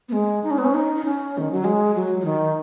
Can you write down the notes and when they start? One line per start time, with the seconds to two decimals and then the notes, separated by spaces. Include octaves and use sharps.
0.09 B3
0.12 G#3
0.44 D#4
0.51 C#4
0.58 B3
0.65 C#4
0.74 D#4
0.96 D#4
1.04 C#4
1.38 D#3
1.52 F#3
1.64 G#3
1.96 F#3
2.20 F#3
2.25 D#3